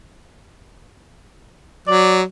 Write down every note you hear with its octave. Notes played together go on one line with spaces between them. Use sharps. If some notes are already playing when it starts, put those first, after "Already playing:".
F#3 D5